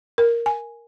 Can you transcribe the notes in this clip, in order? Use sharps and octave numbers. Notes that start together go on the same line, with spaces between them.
A#4
G#5